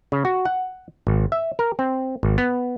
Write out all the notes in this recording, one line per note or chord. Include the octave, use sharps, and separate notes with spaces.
C#3
F#4
F#5
G#1
E5
A#4
C4
G#1
B3